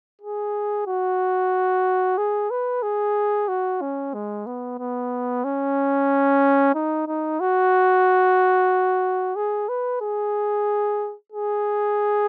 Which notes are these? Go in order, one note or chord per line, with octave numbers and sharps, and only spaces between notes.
G#4
F#4
G#4
B4
G#4
F#4
C#4
G#3
B3
B3
C#4
D#4
D#4
F#4
G#4
B4
G#4
G#4